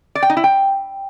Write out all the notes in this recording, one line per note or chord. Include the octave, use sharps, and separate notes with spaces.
D5
G5
D#4
E4
G5